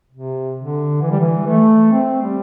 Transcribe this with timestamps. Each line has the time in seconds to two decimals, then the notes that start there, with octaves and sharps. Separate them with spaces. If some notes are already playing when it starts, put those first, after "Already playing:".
0.12 C3
0.57 D3
1.01 E3
1.11 G3
1.20 E3
1.46 A3
1.91 C4
2.22 G3